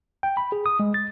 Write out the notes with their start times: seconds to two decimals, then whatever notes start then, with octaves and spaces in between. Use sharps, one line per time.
0.23 G5
0.37 B5
0.52 G#4
0.66 D#6
0.80 G#3
0.94 A6